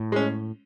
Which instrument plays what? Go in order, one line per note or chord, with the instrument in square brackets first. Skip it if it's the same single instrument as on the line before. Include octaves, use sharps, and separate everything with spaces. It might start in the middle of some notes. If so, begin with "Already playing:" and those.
Already playing: [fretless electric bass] A2
[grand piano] G#3 C#4